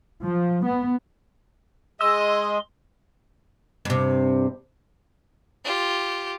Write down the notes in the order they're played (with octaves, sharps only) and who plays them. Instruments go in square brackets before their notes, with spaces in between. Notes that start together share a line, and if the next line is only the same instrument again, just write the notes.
[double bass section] F3
B3
[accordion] G#3 [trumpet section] D#5 [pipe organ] C6 [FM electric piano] E6
[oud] G2 C3
[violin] F4 G4